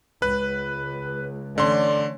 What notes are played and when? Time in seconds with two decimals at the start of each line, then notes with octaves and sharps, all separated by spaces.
0.22 C#2 B4 F#6
1.58 D3 E3 A3 C#4 D5 C6